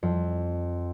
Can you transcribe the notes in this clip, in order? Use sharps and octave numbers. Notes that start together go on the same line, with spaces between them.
F2